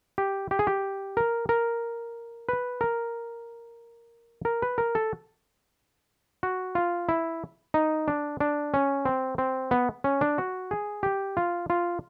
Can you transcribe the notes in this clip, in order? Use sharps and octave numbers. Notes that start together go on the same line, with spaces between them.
G4
G4
G#4
G4
A#4
A#4
B4
A#4
A#4
B4
A#4
A4
F#4
F4
E4
D#4
D4
D4
C#4
C4
C4
B3
C#4
D4
F#4
G#4
G4
F4
F4